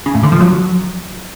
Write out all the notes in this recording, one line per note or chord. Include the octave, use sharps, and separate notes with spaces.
C#3
A2
D3
F3
F#3